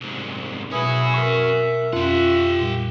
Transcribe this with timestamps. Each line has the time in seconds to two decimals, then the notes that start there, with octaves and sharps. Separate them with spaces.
0.01 C2 G#2
0.72 B2 C#4 E4 F#4 G#4 B4
1.14 A#4 E5 C#6
1.93 F2 C#4 F4 G4 F#5
2.59 A#2 G3